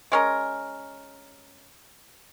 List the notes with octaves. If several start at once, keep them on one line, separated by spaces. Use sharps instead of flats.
G#3 C#4 A#4